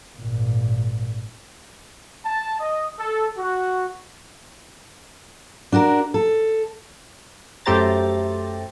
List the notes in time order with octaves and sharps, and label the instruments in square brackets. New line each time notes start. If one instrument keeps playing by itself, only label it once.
[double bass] G#1 A#2
[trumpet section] A5
D#5
A4
F#4
[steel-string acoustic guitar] D4 F#4 A4 A#4
A4
[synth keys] F#2 A3 G4 C5 A#5 A6